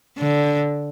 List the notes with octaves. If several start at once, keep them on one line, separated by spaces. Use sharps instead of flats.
D3